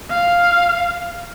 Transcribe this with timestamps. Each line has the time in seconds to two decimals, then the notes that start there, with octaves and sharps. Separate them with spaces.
0.11 F5